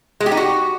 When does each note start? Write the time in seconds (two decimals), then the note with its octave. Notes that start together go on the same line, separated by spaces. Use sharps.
0.20 G#3
0.26 G4
0.32 D#4
0.37 F#4